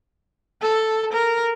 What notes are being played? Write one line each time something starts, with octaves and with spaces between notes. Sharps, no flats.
A4
A#4